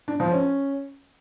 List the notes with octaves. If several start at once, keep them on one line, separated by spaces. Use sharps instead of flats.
D4
F3
C#4